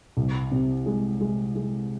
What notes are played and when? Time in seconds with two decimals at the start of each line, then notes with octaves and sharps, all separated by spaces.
0.17 C2
0.52 C3
0.86 G#3
1.20 G#3
1.55 G#3